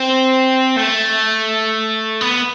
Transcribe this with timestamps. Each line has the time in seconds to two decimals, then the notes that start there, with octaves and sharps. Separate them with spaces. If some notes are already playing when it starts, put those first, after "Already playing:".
Already playing: C4
0.76 A3
2.21 B3